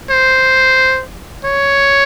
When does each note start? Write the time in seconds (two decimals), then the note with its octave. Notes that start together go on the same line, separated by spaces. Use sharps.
0.10 C5
1.45 C#5